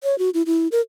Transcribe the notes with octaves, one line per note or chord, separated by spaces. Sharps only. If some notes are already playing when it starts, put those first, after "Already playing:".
C#5
F#4
E4
E4
A#4